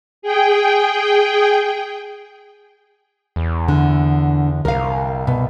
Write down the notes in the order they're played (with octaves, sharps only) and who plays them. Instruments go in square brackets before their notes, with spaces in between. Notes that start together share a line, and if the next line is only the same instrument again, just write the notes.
[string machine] G#4 G5
[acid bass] E2
[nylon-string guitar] D3
[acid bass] C2 [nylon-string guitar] A#4 F5
[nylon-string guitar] B2